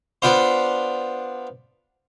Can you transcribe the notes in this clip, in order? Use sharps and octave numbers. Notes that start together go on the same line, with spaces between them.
B3 D4 F4 C5